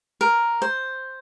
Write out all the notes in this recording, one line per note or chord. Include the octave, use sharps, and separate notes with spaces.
A#4
C5